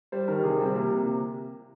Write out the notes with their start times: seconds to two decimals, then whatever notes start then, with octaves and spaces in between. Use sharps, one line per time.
0.12 G3 C5
0.28 D#3 A#4
0.43 C3 G#4
0.55 G#4
0.60 G3 C4
0.75 C3 A#3
0.91 C3
1.06 C3